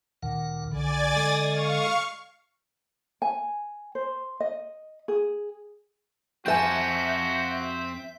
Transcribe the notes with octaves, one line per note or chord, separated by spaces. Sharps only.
D2 A#2 D#3 F#5
B1 D3 D5 G#5 A6
G#3 A4 D#5
F5 C#6
G#5
C5
D#5
G#4
F2 C4 F#4 A4 E5 G#5 A5 G6